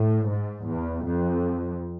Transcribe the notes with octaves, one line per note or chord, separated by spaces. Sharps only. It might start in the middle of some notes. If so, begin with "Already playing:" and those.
Already playing: A2
G#2
E2
F2